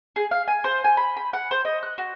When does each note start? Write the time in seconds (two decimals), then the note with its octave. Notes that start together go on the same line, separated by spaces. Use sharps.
0.16 G#4
0.31 F5
0.48 G#5
0.64 C5
0.84 G#5
0.97 B5
1.17 B5
1.33 F#5
1.51 C5
1.65 D#5
1.83 F#6
1.98 F#4